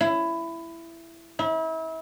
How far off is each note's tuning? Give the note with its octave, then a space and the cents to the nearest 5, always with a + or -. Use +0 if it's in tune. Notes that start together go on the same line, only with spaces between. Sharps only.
E4 +15
E4 -35